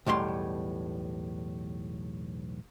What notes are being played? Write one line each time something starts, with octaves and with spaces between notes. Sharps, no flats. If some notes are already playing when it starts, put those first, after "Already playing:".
B1 E2 A2 G3 C6